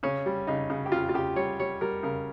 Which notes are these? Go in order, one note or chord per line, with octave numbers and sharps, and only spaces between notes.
C#3 C#4
G3
C#3 D#4
C#3
G4
C#3 F4
F4
C#3 G4
G3 C#5
G3 C#5
G3 A#4
C#3 A#4